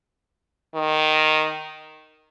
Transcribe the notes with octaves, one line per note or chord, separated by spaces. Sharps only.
D#3